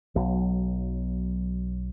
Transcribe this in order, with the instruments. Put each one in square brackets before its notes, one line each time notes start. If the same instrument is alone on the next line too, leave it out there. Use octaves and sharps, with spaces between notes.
[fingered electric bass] B1 F#3 B3